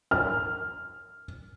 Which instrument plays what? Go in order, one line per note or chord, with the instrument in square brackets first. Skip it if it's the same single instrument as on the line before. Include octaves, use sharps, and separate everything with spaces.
[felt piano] F6